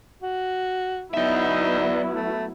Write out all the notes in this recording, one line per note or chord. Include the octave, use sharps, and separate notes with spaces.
F#4
F#3 B3 D#4 E4 D5 E5
A3